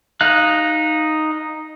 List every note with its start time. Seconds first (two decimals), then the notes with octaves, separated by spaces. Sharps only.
0.21 D#4 F5 F#6